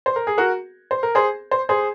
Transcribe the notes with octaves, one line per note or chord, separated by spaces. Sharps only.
C5
A#4
G#4
F#4 A#4
C5
A#4
G#4 C5
C5
G#4 C5